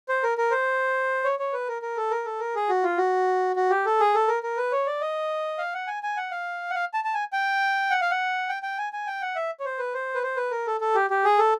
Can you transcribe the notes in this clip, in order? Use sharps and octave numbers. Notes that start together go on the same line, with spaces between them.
C5
A#4
A#4
C5
C#5
C#5
B4
A#4
A#4
A4
A#4
A4
A#4
G#4
F#4
F4
F#4
F#4
G4
A4
G#4
A4
A#4
A#4
B4
C#5
D5
D#5
F5
F#5
G#5
G#5
F#5
F5
F#5
F5
A5
A5
G#5
G5
F#5
F5
F#5
G5
G5
G#5
G#5
G5
F#5
E5
C#5
C5
B4
C5
B4
C5
B4
A#4
A4
A4
G4
G4
G#4
A4